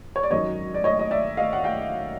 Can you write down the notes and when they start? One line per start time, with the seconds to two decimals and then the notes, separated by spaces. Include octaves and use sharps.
0.16 C#5
0.23 D5
0.31 G#1 F#2 D#3 C#5 D#5
0.74 D5
0.84 C#5 D#5
0.99 D#5
1.11 D5 E5
1.37 D#5 F5
1.53 F#5
1.64 F5 G5